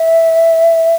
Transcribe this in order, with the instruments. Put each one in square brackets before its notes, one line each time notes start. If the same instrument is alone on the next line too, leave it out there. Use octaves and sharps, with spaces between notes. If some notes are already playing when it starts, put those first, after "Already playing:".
Already playing: [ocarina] E5